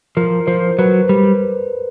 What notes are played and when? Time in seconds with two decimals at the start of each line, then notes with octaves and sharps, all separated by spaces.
0.17 F3 A#4
0.47 F3 C5
0.79 F#3 B4
1.09 G3